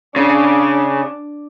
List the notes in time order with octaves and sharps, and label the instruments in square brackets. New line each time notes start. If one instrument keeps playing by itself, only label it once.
[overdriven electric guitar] C#3 [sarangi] D4